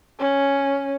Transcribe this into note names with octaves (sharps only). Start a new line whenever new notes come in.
C#4